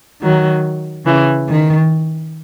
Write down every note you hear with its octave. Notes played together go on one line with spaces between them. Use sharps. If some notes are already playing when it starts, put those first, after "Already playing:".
D#3 F#3
C#3 E3
D#3